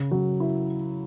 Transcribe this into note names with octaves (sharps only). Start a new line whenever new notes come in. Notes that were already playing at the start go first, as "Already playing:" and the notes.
Already playing: C#3
F#3
E4